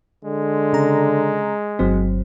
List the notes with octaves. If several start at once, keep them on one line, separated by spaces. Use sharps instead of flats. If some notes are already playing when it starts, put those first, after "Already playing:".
D3 G#3
C#3 A#5
G1 F#3 C4